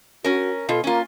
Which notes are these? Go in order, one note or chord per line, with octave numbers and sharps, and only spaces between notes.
C#4 F#4 A#4
B2 F4 A4
A#3 C#4 F4